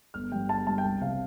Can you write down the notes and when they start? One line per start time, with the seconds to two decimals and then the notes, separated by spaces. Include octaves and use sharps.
0.14 G1 F6
0.32 G2 G3 G5
0.49 G1 A5
0.67 G2 G3 A5
0.78 G5
0.84 C2 A5
1.01 C3 G3 F5